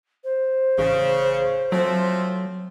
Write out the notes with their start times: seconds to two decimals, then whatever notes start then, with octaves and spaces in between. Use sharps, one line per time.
0.24 C5
0.78 A1 C#3
1.72 F3 F#3 A3 C4